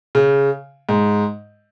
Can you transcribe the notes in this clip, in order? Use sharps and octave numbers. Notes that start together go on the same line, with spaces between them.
C#3
G#2